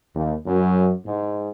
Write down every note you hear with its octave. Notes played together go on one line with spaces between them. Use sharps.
D#2
F#2
G#2